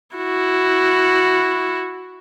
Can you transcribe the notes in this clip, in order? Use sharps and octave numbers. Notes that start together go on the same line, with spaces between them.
E4 F#4